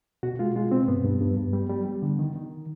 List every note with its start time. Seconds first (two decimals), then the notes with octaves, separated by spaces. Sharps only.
0.23 B2 F#4
0.39 G#3 F4
0.56 G#3 F4
0.72 B2 C4
0.88 G2 B3
1.04 G2
1.21 G2
1.38 G2
1.53 G3
1.70 G3
1.86 G3
2.02 D3
2.19 D#3
2.36 D#3